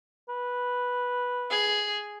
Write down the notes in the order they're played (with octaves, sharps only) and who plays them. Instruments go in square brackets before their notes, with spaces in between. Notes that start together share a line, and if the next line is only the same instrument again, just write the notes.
[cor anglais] B4
[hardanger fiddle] G#4